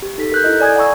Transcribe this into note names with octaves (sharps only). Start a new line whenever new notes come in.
G4
D#4 A4 B6
A#4 F#6 G6
E4 A4 D#5
D5 G#5 D#6 G#6
F#5 G#5 A#5 C#6 E6